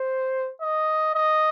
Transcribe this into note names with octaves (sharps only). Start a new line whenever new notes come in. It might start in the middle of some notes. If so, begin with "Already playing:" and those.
Already playing: C5
D#5
D#5